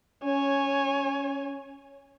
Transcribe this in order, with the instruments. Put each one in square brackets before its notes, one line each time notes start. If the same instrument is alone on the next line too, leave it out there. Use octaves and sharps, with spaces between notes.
[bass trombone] C#4 [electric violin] C#5 G#5